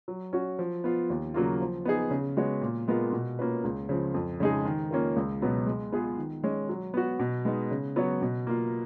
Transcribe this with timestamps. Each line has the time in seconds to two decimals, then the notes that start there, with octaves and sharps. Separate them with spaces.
0.08 F#3
0.33 C#4 F#4
0.59 F3
0.84 B3 F4
1.10 D#2
1.34 C#3 F#3 A#3 F4
1.61 F3
1.85 B3 D#4 G#4
2.11 C#3
2.37 G#3 B3 F#4 C#5
2.61 A#2
2.88 G#3 B3 F4 A#4
3.12 B2
3.39 A#3 C#4 F4 B4
3.64 C#2
3.89 C#3 F3
4.14 F2
4.40 C#3 G#3 D#4 G#4
4.65 D#3
4.91 A#3 C#4 F4 A#4
5.16 C#2
5.42 B2 F#3 B3
5.67 G#3
5.92 B3 F4 G#4 B4
6.17 D#3
6.44 G#3 C#4
6.69 F#3
6.94 B3 F#4
7.19 B2
7.45 G#3 B3 D#4
7.71 C#3
7.96 F#3 B3 F#4 C#5
8.22 B2
8.47 A#3 F4